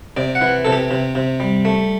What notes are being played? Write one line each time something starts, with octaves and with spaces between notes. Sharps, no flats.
C3 D5
F#5
E3
C3 A4
G4
C3
C3
G3
A3